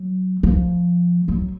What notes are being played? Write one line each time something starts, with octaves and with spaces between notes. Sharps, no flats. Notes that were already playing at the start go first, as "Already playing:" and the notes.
Already playing: F#3
F3
F#3